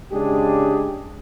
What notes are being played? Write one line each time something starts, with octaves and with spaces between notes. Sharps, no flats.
C#3 G#3 D4 G4 G#4